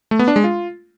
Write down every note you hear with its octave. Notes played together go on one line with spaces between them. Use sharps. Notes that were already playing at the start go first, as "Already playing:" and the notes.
A3
B3
D4
G#3
F4